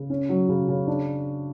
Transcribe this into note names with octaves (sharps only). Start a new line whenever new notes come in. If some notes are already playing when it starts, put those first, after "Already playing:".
Already playing: C#3
C#4
F#3
C#3
C#3
D4